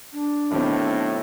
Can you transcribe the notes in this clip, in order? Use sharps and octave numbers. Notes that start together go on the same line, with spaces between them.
D4
B1 A2 D#3 C4